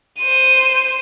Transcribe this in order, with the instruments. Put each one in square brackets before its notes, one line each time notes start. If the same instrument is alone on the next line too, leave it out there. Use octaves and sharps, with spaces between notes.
[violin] C5 D#7